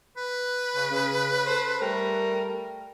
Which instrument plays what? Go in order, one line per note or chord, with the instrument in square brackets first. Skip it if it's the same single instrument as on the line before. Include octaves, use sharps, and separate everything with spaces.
[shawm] B4
[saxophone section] C#3
C#3
A4 C5
G3 A3 A#4